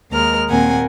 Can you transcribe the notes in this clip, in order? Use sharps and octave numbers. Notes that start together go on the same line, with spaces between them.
D#2 G#3 A#4 F6
D#2 A#2 C4 A#4 F#5 G#5